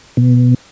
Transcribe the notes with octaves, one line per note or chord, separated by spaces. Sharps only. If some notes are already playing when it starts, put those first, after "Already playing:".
B2